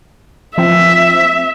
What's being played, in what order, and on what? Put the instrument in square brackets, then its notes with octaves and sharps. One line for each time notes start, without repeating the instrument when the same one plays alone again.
[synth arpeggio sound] F3 C4 [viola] E5